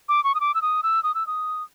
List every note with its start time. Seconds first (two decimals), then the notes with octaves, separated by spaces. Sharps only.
0.09 D6
0.24 C#6
0.35 D#6
0.40 D6
0.55 E6
0.62 D#6
0.83 E6
1.03 D#6
1.15 E6
1.27 D#6